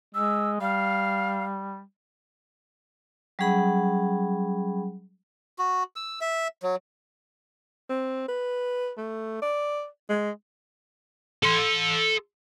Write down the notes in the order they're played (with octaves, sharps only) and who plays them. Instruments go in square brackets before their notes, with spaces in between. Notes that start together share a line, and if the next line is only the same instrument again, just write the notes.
[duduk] G#3 [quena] E6
[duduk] G3 [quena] F5
[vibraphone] F#3 G3 C#4 G#4 F#5 B5
[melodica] F#4
E6
E5
F#3
[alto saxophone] C4
B4
A3
D5
G#3
[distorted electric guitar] A4 C6